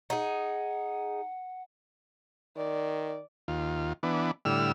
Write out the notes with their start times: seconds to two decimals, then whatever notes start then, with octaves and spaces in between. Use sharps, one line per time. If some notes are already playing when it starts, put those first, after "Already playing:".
0.10 D#4 G#4 F#5
2.57 D#3 D5
3.48 D#2 F4
4.03 E3 B3 D4
4.45 A2 D3 G3 E4 E6 F6